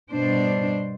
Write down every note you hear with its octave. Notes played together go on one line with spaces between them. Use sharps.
G2 B2 D4 C5